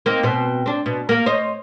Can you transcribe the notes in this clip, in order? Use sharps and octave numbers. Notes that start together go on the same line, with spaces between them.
A#3 C4 D#4
B2 C4
C4 D4
B2
A#3 A#4
C5 C#5 D#5